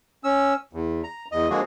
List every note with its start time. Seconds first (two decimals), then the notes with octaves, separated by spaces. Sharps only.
0.24 C#4 E6
0.73 E2
1.04 A#5
1.32 E2 D#5
1.50 D3 F3 G#3 A#3 F#4 G#4